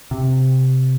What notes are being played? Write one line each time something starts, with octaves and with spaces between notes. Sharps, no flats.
C3